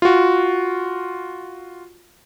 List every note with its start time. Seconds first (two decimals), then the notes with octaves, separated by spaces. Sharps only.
0.02 F4 F#4